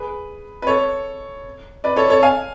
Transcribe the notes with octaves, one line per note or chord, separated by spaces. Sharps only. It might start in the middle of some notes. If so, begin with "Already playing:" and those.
Already playing: G#4 B4
B4
A4 C#5
B4 D5
A4 C#5
A4 C#5
F5 G#5